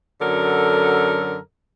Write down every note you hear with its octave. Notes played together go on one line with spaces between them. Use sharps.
F#2 D3 F#3 A4 A#4